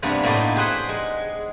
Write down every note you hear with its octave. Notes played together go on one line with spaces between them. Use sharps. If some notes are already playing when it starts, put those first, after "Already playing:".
G2 C3 G3 A#3 B3
A2 A#3 B3 D#4 D5 C6
G4 G#4 B4 C5 F#5 G5
G#3